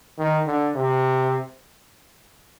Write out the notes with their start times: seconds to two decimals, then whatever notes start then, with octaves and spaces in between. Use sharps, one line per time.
0.18 D#3
0.47 D3
0.76 C3